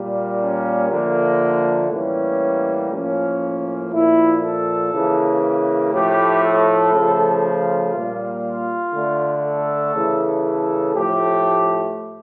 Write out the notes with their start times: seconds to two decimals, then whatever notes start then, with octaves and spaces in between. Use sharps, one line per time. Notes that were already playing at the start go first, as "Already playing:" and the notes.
Already playing: A#2 G3 A#3
0.41 C#4
0.90 D3 F3 A3 A#3
1.90 A2 E3 G3 A#3 C#4
2.91 A2 F3 A#3 C#4
3.92 A#2 F3 A#3 E4
4.43 A4
4.93 C#3 E3 A#3
5.93 A2 F3 A3 G4
6.44 A4
6.94 C#3 F3 A3
7.44 F4
7.95 A#2 G3 A#3
8.44 F4
8.94 D3 A3
9.45 A4
9.95 C#3 E3 A3
10.45 A4
10.95 A2 F3 A3 G4